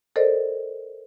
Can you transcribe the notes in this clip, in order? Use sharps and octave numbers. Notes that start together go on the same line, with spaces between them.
A4 A#4 C5 D5 D#5